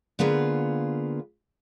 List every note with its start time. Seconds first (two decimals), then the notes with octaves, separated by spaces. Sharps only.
0.19 D3 A#3 B3 F4 G#4 B4